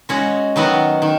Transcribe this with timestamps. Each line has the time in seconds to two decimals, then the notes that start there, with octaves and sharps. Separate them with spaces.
0.09 G#3 C#4 F#4
0.56 D#3 F#3 B3 F#4
1.02 D#3